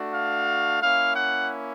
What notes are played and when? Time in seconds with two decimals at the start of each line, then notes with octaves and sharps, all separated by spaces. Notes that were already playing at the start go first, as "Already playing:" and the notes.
Already playing: A3 D4 F#4
0.13 F5
0.81 A#3 C#4 E4 F5
1.16 F#5